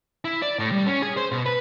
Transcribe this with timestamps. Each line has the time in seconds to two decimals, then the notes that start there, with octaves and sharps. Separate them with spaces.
0.25 E4
0.42 D5
0.59 A2
0.72 G3
0.86 C#4
1.02 G#4
1.17 C5
1.32 B2
1.46 B4